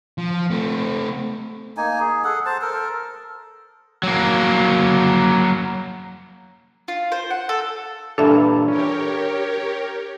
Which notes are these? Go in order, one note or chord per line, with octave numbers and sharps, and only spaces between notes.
F3
A3 C4
A#3 D#4 G#5
G#4
G#4 A4 F#5
C5 A5
A4 A#4
F#3 A#3
F4
C5
F#5
A4
G2 A#2 E3 D4 A4 E5
C#4 G4 A#4 C#5